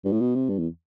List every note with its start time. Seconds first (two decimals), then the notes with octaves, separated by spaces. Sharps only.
0.05 G2
0.12 A2
0.21 B2
0.35 C3
0.49 G2
0.59 E2